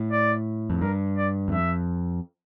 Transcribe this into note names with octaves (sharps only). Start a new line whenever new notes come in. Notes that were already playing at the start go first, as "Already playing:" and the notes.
Already playing: A2
D5
F2
G2 A#4
D5
E2
F2 E5